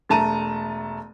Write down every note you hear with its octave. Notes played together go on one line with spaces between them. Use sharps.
E1 A3 A5 A#5 D#7